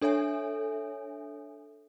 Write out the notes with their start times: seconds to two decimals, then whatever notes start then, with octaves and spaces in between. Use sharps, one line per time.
0.02 D4 A4 C#5 E5 G#5